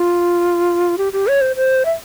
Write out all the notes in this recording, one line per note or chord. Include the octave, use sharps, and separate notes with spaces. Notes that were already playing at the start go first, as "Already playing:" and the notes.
Already playing: F4
G4
G4
C#5
C5
C5
E5